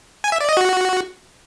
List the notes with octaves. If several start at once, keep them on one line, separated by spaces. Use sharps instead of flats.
G#5
E5
D5
D#5
F#4